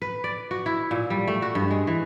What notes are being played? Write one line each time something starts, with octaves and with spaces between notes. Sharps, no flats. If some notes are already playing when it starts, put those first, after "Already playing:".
B4
D5
F#4
E4
A#2
G3
A3
F#4
G2
G#3
E3